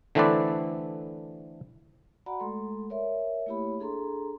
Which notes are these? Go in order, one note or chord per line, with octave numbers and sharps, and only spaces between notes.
D3 E3 A3 C4 B4 D5
F#4 D5 F#5 A#5 B5
G#3 A3 A4 C6
A#4 C#5 D5 E5
A3 A#3 E4 G4 C#5 B5
D4 G#4 A4 A#5 C6